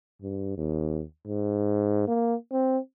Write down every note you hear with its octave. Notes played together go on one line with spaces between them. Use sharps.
G2
D#2
G#2
A#3
C4